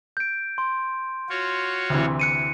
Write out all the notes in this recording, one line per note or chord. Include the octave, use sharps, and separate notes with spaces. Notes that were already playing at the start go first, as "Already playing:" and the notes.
G6 D7
C6
F4 F#4 C#5
D2 C3 E3
F#6 C#7 D#7